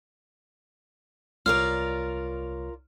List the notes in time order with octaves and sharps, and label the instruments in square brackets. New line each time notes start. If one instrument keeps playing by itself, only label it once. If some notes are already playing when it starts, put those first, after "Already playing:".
[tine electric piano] C2 C#5 [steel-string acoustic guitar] F4 A#4 D5 [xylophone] F6